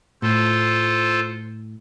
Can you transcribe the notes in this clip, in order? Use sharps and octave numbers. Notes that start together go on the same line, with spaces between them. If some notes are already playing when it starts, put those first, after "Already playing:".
A2 F4 A4 C5